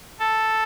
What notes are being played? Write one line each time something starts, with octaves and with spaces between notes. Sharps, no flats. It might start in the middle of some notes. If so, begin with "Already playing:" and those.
A4